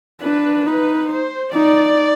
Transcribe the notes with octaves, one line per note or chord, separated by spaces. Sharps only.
D4 B4
D#4 B4
C5
D#4 D5